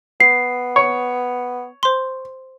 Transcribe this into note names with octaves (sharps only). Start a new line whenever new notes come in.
B3 C7
C#5
C5 C6